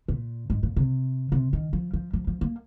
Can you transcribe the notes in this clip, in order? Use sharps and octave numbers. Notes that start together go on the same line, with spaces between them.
A#2
G#2
A#2
C3
C3
D#3
F3
F3
F3
F3
A#3